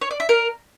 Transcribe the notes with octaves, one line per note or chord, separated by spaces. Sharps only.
C#5
D5
E5
A#4